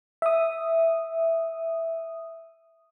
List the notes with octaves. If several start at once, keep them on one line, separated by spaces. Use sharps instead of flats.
E5 D#6